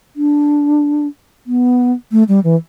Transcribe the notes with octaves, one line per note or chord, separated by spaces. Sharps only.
D4
B3
A3
G3
E3